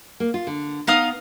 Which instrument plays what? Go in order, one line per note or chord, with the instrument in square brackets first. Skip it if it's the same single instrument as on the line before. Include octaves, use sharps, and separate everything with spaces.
[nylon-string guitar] A#3
F4
D3
[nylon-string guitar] B3 [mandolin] D#4 F5 D#6